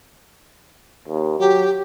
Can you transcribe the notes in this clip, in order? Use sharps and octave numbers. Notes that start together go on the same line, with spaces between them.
D#2
F#3 G4